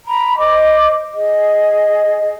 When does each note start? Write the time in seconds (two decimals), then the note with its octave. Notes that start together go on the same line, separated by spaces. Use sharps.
0.06 A#5 B5
0.37 C5 D#5 D6
1.12 G#4 D#5